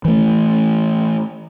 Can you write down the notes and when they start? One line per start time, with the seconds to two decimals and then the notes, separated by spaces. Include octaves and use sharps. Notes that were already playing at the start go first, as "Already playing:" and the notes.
0.05 E3 A3